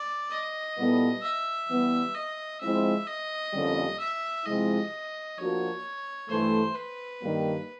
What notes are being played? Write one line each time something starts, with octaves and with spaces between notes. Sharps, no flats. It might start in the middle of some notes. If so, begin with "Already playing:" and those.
Already playing: D5
D#5
A#2 G3 B3 E4 A4
E5
E3 G3 B3
D#5
F3 G#3 C4 E4 E5
D#5
F2 D3 G3 A#3 C#4
E5
C3 F3 G#3 C4 E4 D#5
F3 A#3 D4 F#4 C#5
G2 E3 A3 C5
B4
G2 D#3 G3 A#3